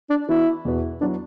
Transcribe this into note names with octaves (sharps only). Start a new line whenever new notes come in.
D4
E3 B3 E4 F#4 B4
E2 B2 B3 F#4 B4
F#3 B3 D4 E4 B4